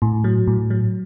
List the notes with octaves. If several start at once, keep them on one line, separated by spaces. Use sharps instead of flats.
A2
F#3
A2
F#3